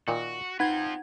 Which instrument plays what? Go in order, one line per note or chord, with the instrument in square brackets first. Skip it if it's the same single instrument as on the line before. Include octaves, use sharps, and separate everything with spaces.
[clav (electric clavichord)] A#2 D#3 [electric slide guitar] F#4
[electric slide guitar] C4 F4 [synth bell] D#4 G#6 [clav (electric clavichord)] B4 [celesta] F#5